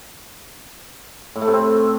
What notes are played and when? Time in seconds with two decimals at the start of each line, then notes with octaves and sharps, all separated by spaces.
1.36 A2
1.42 A3
1.47 C3
1.53 C4